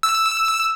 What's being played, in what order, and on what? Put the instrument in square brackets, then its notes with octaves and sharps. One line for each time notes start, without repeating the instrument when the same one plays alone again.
[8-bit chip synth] E6